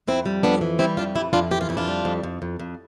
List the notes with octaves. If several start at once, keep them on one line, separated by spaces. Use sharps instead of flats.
F2 C4 E4
G3
F2 B3 D4
E3
G3 C4 E4
F2 D4 F4
E3 E4 G4
F2 D4 F4
E3 G4
F4
F2 E4
D4 F4
G3
F2
F2
F2
F2